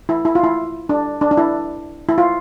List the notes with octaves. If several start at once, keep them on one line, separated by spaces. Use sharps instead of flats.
E4
E4
F4
E4
D4
D4
D4
E4
E4
F4